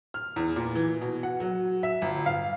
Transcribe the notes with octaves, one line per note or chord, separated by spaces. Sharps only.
F6
E2
A#2
E3
B2
F#5
F#3
E5
G1
F5